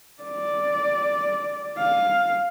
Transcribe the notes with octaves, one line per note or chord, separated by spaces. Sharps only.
D5
F5